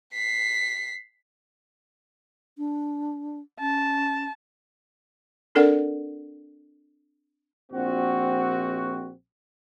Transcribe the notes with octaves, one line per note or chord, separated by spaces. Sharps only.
B6 C7
D4
C#4 A5
C4 D4 A4 A#4 D5 F#5
A#1 C4 F#4